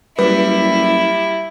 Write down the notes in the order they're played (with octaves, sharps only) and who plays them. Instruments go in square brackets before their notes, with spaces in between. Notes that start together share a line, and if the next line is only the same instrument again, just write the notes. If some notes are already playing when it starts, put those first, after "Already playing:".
[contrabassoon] F#1 [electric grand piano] G3 [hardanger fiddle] E4 [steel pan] B4